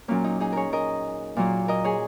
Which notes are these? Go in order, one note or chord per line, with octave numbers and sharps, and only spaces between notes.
A#2 F#3 A#3 C#4
D#4
D#4 G#4
G#4 A#4 C#5
A#4 D#5
A#2 F#3 A#3
A#4 D#5
G#4 C#5